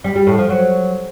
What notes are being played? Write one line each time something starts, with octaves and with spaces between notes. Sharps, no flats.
G3
G3
A2
F3
F#3